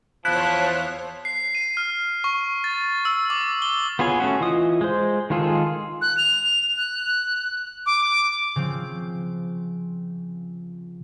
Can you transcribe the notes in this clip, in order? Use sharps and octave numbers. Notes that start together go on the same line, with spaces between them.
E2 F3 E4 C5 C#5 F#6
C7
D#7
F6
C#6
A6
E6
D6
G7
B3 F4 G#4 C#5
A3 C#4 F#4
E3 F4 D#5 D#6
G#3 C5
D#3 G#3 F4 G#4 A4
F#6
F7
F#6
D6
C#3 F3 C4